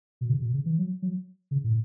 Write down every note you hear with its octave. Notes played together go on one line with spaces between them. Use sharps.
B2
C#3
B2
C#3
E3
F#3
F#3
C#3
A2